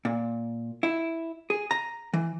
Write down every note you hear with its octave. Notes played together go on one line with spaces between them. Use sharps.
A#2
E4
G#4
A#5
E3